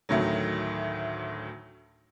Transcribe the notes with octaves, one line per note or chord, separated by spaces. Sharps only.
D2 A2 D#3 F#3